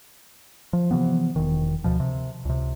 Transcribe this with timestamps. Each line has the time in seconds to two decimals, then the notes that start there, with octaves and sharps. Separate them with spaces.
0.73 F3
0.91 C3 E3 F3 B3
1.36 E1 D#3
1.84 D2 B2 F3
2.00 C3
2.45 C#2 C3